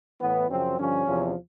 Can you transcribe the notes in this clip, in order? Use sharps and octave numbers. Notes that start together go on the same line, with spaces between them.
A2 E3 B3
F#2 C#3 F3 C4
G2 D3 F3 C#4
E2 C3 F3